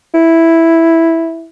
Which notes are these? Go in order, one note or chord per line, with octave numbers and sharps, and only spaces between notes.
E4